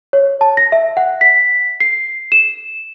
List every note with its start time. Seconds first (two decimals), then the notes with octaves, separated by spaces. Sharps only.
0.13 C#5
0.41 A5
0.57 A#6
0.72 E5
0.97 F#5
1.21 B6
1.80 C7
2.32 E7